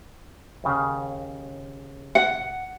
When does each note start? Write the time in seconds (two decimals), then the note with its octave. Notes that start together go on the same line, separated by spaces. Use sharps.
0.64 D#2 C#3
2.15 F#5